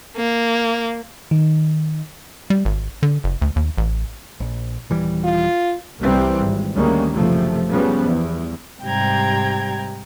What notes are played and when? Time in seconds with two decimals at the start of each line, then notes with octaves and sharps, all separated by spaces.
0.17 A#3
1.31 D#3
2.50 G3
2.65 G#1
3.03 D3
3.24 F#1
3.42 D2
3.56 D#2
3.78 A1
4.40 A#1
4.90 D#1 E3 G3
5.24 F4
5.99 C2 E3 G3 A#3 C4
6.36 G#1
6.75 D2 D#3 G3 G#3 A#3 C#4
7.14 F#1 C3 F3 A3
7.68 C#3 F3 G3 B3
8.04 E2
8.82 G#2 C3 G3 G5 A#5 G#6